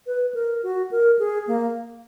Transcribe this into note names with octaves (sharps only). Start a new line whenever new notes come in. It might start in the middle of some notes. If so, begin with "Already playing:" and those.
B4
A#4
F#4
A#4
G#4
A#3